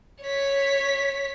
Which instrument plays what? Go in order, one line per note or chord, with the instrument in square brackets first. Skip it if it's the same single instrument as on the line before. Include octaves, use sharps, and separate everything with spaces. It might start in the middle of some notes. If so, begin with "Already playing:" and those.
[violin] C#5 B6